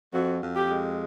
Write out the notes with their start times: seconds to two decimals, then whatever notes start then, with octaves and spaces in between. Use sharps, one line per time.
0.13 F2 F#4
0.42 F2
0.56 G4
0.71 G#3